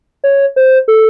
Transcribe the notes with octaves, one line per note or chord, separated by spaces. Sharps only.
C#5
C5
A4